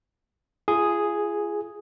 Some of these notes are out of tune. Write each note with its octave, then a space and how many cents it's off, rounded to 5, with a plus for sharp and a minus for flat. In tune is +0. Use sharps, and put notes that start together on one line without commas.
F4 -35 G#4 +0